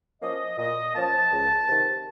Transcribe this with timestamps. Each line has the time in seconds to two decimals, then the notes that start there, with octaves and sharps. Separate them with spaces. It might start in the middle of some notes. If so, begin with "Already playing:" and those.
0.22 F3 A#3 C#4 D#5
0.58 A#2 D#5
0.95 F3 A#3 C#4 A5
1.32 C#2
1.69 C3 D#3